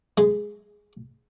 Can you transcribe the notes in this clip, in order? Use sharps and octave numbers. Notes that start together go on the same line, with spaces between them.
G#3